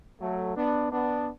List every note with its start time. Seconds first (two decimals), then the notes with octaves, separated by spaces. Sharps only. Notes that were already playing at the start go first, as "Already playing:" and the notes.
0.21 F#3 A3
0.56 B3 D4
0.92 B3 D4